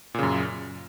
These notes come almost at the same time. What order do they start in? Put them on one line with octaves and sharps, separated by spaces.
A#2 C#3 F#2